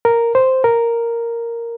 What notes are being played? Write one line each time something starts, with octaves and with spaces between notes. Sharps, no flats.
A#4
C5
A#4